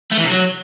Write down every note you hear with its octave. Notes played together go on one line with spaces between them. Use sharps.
A3
E3
C3
F#3